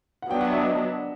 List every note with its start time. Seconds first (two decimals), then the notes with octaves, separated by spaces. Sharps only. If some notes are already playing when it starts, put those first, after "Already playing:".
0.22 F#5
0.30 F#3 B3 D4 G5
0.41 F#5
0.51 E5
0.62 D#5